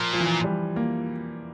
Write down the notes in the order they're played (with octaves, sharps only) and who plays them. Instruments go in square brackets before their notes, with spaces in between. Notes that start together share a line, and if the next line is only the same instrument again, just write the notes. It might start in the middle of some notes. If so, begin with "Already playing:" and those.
Already playing: [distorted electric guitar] A#2 [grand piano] F3
[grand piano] F3
E3
F3
G3
A#3